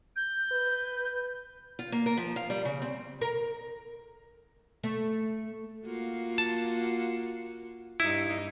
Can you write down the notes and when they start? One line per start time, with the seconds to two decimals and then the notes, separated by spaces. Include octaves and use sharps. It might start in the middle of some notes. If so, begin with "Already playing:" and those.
0.16 G6
0.52 B4
1.79 F4
1.92 A#3
2.06 A#4
2.17 F3
2.36 F5
2.50 G3
2.65 C#3
2.82 C4
3.21 A#4
4.84 A3
5.85 A#3 F4 F#4
6.38 A5
8.00 G2 D#4 E4